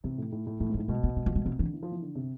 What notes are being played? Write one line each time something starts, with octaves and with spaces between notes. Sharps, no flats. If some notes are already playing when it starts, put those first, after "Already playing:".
C3 E3
A2
A2
A2
A2 E3
G#2 F3
A2
B2 G#3
B3
A3
F3
G#3
C3 F3
D3 E3
E3
F3
E3
D3
C3